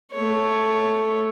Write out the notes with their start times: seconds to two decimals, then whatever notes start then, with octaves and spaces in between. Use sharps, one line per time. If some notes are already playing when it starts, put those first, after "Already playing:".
0.12 A3 C#5